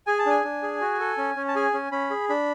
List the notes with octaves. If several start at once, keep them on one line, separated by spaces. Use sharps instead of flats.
G#4 G#5
A5
D4 G#5
D4
G#4
F#4
A4
C#4
C#4
A5
G#4 G#5
C#4
C#4 B5
G#4
D4 B5